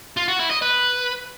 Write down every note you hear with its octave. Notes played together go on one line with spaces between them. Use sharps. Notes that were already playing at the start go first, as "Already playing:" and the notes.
F4
F#4
E4
D#5
B4